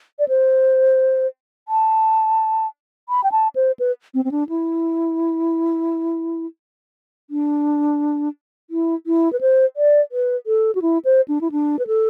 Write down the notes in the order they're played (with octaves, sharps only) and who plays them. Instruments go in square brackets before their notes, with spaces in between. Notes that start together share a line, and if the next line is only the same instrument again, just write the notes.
[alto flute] D5
C5
A5
B5
G5
A5
C5
B4
C4
C4
D4
E4
D4
E4
E4
B4
C5
D5
B4
A4
F#4
E4
C5
D4
E4
D4
B4
A4